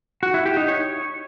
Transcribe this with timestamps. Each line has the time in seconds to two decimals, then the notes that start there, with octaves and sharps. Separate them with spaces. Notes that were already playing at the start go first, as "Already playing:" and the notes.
0.23 F#4
0.34 E4
0.45 G4
0.57 D#4
0.68 C#5